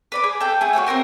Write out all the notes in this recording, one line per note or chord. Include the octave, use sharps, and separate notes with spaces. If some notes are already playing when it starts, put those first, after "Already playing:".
B4 D5 B5
G#4
A4 G5
A3 G#4
F#4 B4 C#5 E6
C4 F#4 A#4 C6